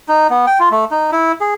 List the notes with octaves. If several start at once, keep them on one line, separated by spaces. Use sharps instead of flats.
D#4
B3
G5
F4
A3
D#4
E4
G#4